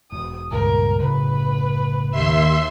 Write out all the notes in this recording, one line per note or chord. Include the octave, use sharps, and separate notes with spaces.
E1 D#6
C#2 G2 A#2 A#4
F#1 A2 C#3 B4
D#2 E5 C6